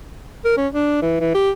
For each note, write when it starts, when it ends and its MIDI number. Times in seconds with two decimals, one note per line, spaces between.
0.45 0.57 70
0.57 0.67 61
0.74 1.00 62
1.02 1.15 52
1.20 1.31 52
1.35 1.50 67